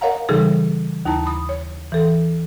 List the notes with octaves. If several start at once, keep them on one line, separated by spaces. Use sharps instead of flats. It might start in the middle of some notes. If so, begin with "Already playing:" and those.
A#4 C#5 D#5 F5 F#5 A#5
C#3 E3 G3 D#4 G#4 A4
D#2 D#4 E4 A5 A#5
B5 D#6
C#5
E3 A4